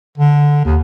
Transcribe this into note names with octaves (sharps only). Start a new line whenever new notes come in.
D3
D#2